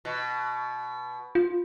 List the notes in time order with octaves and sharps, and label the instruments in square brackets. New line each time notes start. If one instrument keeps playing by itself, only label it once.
[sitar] B2
[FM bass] F4